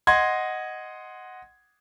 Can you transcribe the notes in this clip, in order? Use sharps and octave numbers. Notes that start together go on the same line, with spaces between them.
D#5 F#5 C6 G#6